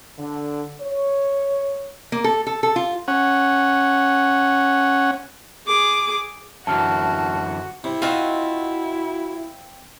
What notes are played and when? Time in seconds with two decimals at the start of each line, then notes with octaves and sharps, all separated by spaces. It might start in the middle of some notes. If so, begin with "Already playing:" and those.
0.18 D3
0.81 C#5
2.12 A#3
2.24 A4
2.47 A4
2.63 A4
2.76 F4
3.08 C#4 F#5
5.67 G#4 D6
6.67 F#2 D3 E3 F#4 A5 F6
7.84 C3 E4
8.02 C4 F4 F#4 D#5 F5